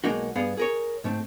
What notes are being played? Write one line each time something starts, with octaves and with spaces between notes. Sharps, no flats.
B1 G#3 A#3 D#4 F#4
G2 B3 G#4 F5
G#4 A#4 C#5
G#2 A3 C4